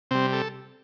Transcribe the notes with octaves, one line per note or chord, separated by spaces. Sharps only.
C3 G3 C4
A4